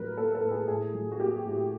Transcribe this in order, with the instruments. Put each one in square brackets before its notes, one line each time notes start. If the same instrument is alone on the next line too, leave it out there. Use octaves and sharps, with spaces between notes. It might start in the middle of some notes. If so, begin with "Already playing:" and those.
Already playing: [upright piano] A2 F#3 [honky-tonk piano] A#4 B4
[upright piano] A#3 [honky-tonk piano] A4
[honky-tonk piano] A4
[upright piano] A2
[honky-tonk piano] G#4
[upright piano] A2 [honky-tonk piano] G#4
[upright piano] F#3
[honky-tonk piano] F#4
[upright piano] A#3 [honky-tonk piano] G4
[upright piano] A2